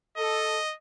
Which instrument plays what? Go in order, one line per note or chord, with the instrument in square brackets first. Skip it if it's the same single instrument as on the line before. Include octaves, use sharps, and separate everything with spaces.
[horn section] A4 [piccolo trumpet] D#5